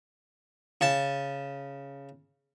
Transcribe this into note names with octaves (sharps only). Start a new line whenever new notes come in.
C#3 A5